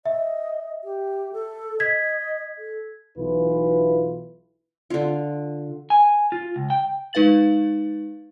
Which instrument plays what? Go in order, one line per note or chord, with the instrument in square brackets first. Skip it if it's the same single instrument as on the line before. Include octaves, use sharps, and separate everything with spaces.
[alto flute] D#5 [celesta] E5
[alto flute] G4
A4
[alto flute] D#5 [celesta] G#6 B6
[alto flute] A4
[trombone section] B1 E3 F4 B4
[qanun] D3 F4
[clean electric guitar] G#5
F4
C#2
G5
[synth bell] G#3 D#4 B4 F5 A6 F#7